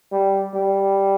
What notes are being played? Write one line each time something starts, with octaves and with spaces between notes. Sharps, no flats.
G3
G3